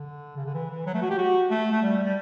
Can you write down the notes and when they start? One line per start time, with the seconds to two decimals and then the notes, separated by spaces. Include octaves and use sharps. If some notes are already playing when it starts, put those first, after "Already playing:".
Already playing: D3
0.37 C#3
0.46 D3
0.54 E3
0.71 E3
0.86 F#3
0.94 A3
1.02 F#4
1.10 G4
1.18 F#4
1.50 A3
1.72 A3
1.82 G3
2.04 G3